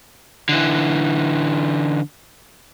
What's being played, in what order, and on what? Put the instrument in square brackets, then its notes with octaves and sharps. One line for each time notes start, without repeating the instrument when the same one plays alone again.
[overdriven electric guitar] D3 E3